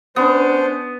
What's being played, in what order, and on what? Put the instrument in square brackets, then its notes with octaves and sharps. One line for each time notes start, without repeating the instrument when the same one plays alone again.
[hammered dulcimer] B3 [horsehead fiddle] C#4 D4 [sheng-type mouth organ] C5